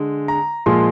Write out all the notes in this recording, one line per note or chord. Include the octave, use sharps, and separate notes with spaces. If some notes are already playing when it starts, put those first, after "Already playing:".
Already playing: D3 G#3
A#5
A#2 F3 G#3 C6